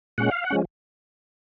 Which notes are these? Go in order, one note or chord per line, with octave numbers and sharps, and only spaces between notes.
A#2 G#3 C#4 F#5
F5
F#5
F3 G#3 C#4